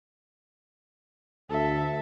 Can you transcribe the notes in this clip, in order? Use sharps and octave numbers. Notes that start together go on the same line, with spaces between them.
D2 A4 E5